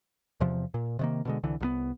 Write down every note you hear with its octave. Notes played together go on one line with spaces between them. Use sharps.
E2 C3 F3
A#2
C3 D#3 A#3
B2 D3 G#3
C2 D3 E3
C2 F3 B3